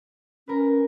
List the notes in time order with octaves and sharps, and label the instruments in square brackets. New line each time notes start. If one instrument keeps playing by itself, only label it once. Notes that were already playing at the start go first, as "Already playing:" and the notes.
[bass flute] C#4 [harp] A#4 B4